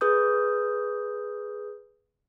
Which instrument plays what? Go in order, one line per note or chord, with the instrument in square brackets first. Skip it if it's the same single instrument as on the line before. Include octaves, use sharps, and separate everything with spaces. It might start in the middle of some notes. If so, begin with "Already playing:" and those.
[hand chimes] G#4 B4 D#6 G6